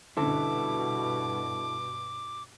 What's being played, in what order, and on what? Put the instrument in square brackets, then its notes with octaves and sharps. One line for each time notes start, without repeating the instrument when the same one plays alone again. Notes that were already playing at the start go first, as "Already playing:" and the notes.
[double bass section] G2 B2 [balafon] D3 C#4 D4 [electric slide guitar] E4 A4 [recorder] D6